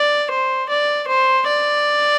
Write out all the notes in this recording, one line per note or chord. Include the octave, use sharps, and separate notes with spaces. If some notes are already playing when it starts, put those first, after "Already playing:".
Already playing: D5
C5
D5
C5
D5